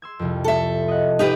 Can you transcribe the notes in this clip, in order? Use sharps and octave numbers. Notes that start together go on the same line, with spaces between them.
C6 E6 G#6
C2 F2
A4 E5
D#5 F#5
D#4 G4 B4 D#6